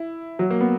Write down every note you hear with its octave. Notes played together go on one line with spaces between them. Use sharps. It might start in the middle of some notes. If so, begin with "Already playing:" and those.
Already playing: E4
F#3
A#3
B3